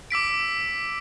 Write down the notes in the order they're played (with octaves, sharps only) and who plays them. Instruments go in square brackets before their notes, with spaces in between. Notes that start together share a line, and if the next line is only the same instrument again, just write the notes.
[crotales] D6 E6 B6 D7